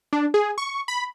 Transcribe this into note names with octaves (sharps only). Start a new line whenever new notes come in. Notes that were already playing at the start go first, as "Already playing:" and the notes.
D4
G#4
C#6
B5